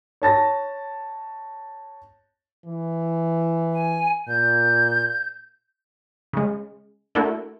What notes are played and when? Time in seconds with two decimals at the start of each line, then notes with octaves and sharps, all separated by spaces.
0.22 C#5 A5 A6 A#6
2.65 E3
3.73 G#5
4.28 A#2 G6
6.33 C#3 G#3
7.15 A3 A#3 D4 E4 F#4 A#4